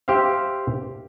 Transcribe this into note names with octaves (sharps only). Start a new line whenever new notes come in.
G4 C5 E5 F5